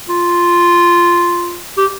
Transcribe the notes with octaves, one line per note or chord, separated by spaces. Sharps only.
F4
G4